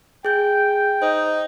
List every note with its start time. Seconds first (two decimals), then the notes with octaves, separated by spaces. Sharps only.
0.25 G#4 G5 G6
1.02 D#4 C5